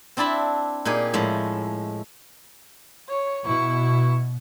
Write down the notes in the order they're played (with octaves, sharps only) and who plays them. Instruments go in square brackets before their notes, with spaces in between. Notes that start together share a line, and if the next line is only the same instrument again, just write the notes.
[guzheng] C4 D4 E4 A5 B5
A#2 D#4 G4 G#4
A2 F3 G#3
[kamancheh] C#5
[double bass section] B2 [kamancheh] E4 C#6